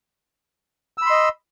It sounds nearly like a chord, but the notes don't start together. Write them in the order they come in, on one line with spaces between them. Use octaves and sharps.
E6 B5 C6 D#5